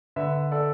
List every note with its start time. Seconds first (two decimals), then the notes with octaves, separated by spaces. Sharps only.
0.16 D3 B4 E5
0.52 A4 D5